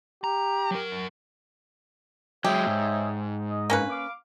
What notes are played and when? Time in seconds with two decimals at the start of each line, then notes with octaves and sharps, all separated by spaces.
0.24 G4 A#5
0.71 F#3 A#4
2.44 F#3 G#3 G4 C#5 D#5 E5
2.67 G#2
3.49 D#5
3.70 G2 A#3 C#4 B4
3.90 F5 D6